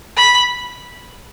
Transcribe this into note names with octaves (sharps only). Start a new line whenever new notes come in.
B5